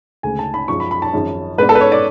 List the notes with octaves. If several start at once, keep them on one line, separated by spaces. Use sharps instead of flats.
D2 C#3 G#3 G#5
A5
B5
F#2 F3 G#3 D4 C#6
B5
B5
A5
G#1 F#2 F3 G#3 C#4
G#2 G#3 B3 D4 B4
A4
B4
C#5
D5